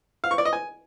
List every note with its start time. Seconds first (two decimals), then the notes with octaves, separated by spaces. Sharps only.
0.24 F5
0.31 C#6
0.38 D5
0.45 D#5
0.53 G#5